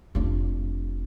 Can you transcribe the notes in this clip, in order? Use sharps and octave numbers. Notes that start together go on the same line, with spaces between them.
F1 D4